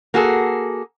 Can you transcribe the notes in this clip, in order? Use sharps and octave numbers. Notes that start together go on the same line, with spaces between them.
A#3 F#4 G#4 A4